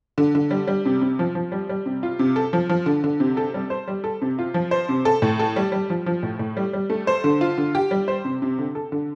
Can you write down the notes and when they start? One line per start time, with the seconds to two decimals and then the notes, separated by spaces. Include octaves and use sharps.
0.18 D3
0.35 D3
0.51 G3
0.67 G3
0.85 C3
1.01 C3
1.19 F3
1.35 F3
1.52 G3
1.69 G3
1.86 C3
2.03 F4
2.19 C3
2.36 A4
2.53 F3
2.69 F3
2.86 D3
3.04 D3
3.20 C3
3.37 A4
3.54 G3
3.70 C5
3.88 G3
4.04 A4
4.22 C3
4.39 F4
4.54 F3
4.71 C5
4.89 C3
5.05 A4
5.22 A2
5.39 A4
5.56 G3
5.72 G3
5.90 F3
6.06 F3
6.23 A2
6.39 A2
6.57 G3
6.73 G3
6.90 A3
7.07 C5
7.24 D3
7.41 F4
7.58 D3
7.75 G4
7.91 G3
8.08 C5
8.25 C3
8.42 C3
8.59 D3
8.75 A4
8.92 D3